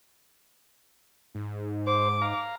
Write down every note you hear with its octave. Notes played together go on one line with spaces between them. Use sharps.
G#2
C5 D6
F5 A#5